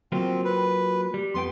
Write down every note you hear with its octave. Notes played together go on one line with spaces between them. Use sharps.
F#3 A#3 C4 F4
B4
G3
F2 B3 G5 C6